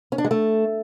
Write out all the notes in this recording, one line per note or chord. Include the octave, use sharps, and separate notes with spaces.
C#4
D4
G#3
A3